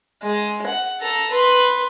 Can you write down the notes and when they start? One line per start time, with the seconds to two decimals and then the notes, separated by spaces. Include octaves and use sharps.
0.22 G#3
0.67 F#5
1.01 A4 A#5
1.31 B4 C6